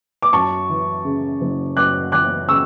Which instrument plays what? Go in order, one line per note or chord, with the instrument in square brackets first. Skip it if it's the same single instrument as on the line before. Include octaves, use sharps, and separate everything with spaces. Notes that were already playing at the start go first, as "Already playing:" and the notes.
[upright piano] D6
F#2 A5 C#6
E3
C#3
F#1
F#2 D6 F#6
E3 D6 F#6
C#3 C#6 E6